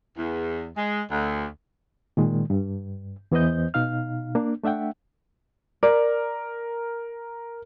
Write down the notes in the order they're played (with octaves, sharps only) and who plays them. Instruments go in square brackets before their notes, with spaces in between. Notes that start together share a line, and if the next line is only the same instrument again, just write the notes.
[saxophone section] E2
G#3
D2
[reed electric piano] A#2 D#3 G#3
G2
E2 E3 B3 C5 D#5 G6
B2 D#4 F5 F6
A#3 D4
A3 D4 E5 F#5 G5
[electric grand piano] A#4 [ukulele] D5